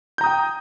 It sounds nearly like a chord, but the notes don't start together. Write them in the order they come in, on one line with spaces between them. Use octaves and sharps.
G6 A#5 D#6 G5